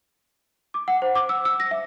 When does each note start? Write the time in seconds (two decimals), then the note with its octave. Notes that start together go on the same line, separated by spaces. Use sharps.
0.74 D6
0.88 F#5
1.02 C5
1.15 D6
1.29 E6
1.45 E6
1.60 A#6
1.71 E5